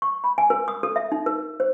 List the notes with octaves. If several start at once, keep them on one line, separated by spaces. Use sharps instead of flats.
C#6
B5
G#5
A#4
D#6
A4
E5
D#4
A#4
C5